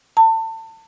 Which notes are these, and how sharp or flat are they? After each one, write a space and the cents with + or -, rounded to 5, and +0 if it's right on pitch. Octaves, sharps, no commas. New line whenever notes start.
A5 +30